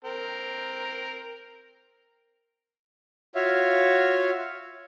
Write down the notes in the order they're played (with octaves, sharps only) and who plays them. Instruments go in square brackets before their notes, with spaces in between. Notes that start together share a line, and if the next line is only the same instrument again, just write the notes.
[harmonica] C4 A#4
[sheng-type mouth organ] F4 F#4 C#5 E5 F5